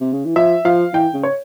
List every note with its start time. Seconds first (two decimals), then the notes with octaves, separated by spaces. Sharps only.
0.01 C3
0.13 C#3
0.25 E3
0.36 F3 E5
0.65 F3 F5
0.94 E3 G5
1.14 C#3
1.23 C#5